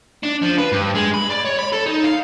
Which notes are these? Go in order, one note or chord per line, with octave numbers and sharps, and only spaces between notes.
D4
F3
B4
G2
G#3
B5
D5
C#5
B5
A4
D#4
F5